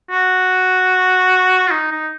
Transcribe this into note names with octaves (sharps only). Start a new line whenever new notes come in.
F#4
F4
D#4
D#4